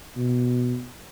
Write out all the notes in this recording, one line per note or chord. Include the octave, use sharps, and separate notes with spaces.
B2